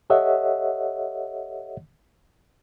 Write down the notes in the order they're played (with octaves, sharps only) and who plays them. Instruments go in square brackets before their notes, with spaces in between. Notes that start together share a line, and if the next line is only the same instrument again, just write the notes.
[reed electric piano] G4 A4 C#5 D#5 E5 F#5